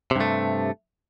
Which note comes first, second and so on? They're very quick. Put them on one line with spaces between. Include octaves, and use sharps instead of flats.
C3 G2 A3